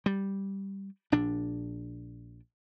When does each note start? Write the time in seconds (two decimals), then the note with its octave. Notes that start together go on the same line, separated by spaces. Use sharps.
0.06 G3
1.12 A#1 D4